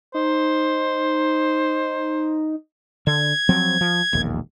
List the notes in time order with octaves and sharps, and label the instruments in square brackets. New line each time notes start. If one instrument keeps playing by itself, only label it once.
[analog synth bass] D#4 [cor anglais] C5
[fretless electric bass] D3 [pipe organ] G#6
[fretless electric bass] F3 F#3 C4
F3
E1 A#1 D#2